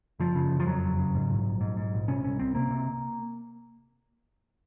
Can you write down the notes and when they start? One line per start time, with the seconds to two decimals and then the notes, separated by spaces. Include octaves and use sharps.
0.20 F#1 F3
0.35 C#3
0.51 F#1
0.60 F3
0.67 F2 F#3
0.83 F#1
0.98 C#3
1.15 G#2
1.30 A#1
1.46 A#1
1.61 G#2
1.77 G#2
1.93 A#1
2.08 C3 C#4
2.24 C2 C#4
2.39 C2 C4
2.55 C3 A#3
2.70 C3